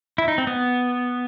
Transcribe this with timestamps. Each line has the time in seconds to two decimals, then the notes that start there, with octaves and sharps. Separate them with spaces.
0.18 E4
0.28 D#4
0.38 C4
0.47 B3